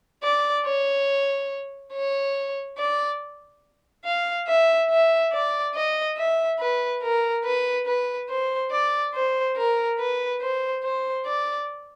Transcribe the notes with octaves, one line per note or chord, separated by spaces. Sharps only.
D5
C#5
C#5
D5
F5
E5
E5
D5
D#5
E5
B4
A#4
B4
B4
C5
D5
C5
A#4
B4
C5
C5
D5